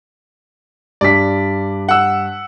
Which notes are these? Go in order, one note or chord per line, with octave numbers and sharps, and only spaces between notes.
G2 D5 B6
F#5 E6